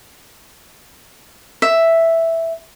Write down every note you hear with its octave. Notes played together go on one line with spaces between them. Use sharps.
E5